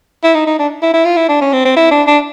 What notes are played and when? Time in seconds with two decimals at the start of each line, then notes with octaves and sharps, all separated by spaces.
0.24 E4
0.35 D#4
0.47 D#4
0.59 D4
0.82 E4
0.94 E4
1.05 F4
1.17 E4
1.29 D4
1.41 C#4
1.53 C4
1.65 C4
1.76 E4
1.91 D4
2.07 D4